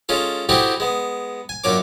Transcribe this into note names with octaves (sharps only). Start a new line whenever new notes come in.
G#3 C#4 F4 A4
C4 D#4 E4 F#4 G4 A4
G#3 B3
G#5
F#2 A#2 D4 C#5 D6